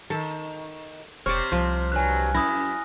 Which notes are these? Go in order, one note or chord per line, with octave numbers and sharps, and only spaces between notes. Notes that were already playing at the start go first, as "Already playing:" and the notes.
D#3 A4
E1 C3 C4 C#5 D5 F6
C2 F3
G2 F#3 G#5 F#6
F#2 E4 D#6 A#6